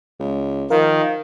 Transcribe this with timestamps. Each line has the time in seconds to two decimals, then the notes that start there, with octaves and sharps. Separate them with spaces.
0.20 C#2
0.70 D#3 F3 A#4 F5